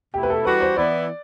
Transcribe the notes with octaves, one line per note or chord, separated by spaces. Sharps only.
B2 A3 E4 G4
B4
A4
E3 G3 D4 F#4 B4
C5
E3 B3 E4 D5